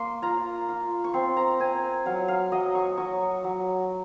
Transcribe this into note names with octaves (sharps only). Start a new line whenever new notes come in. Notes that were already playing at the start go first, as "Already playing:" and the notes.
Already playing: A#3 C6
F4 A#5
F4
C#6
C4 C6
A#5
C4 G#5
F#3 F5
F5
F#3 D#5
C#6
F#3 C#6
F#3